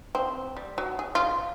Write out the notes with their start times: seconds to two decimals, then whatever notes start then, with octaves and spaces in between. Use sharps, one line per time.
0.15 C4
0.57 G3
0.78 F#3
0.99 G#4
1.15 F4